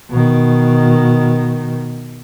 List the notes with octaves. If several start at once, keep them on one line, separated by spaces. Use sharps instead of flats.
B2 D#3